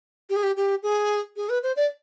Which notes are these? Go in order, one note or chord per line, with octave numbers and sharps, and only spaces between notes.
G4
G#4
G4
G4
G#4
G#4
B4
C5
D5